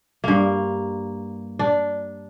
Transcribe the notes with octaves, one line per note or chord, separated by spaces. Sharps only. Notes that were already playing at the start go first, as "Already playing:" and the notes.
G2 A#3
D4